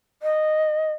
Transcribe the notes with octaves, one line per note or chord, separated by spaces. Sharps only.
D#5